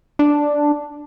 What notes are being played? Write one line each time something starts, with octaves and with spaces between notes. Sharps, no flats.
D4